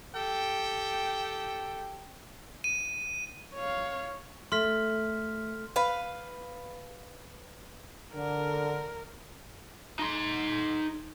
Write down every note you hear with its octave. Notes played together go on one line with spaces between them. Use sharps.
G4 A4 G5
D#7
C#5 F5
A3 C6 F6 B6
B4 F5
D3 A#4
D#4 C6